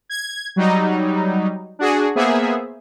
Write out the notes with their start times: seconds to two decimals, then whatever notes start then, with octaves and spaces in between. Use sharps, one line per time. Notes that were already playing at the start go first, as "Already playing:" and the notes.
0.09 G#6
0.56 F#3 G3 D#4
1.79 D4 F#4 G#4
2.15 A#3 B3 G#4 C5 E5